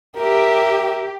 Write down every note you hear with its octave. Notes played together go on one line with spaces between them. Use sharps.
G4 A#4 E5